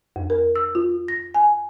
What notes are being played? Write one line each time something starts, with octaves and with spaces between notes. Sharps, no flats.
F2
A#4
E6
F4
A#6
G#5